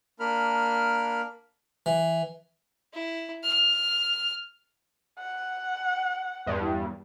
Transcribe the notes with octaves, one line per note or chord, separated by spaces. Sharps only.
A#3 D4 A#4 B5 F6
E3
E4
F6
F#5
E2 G2